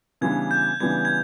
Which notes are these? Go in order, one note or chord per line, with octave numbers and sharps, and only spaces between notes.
C#3 E3 G3 B3 D4 G#6
G6
C#3 E3 G3 B3 D4 G#6
G#6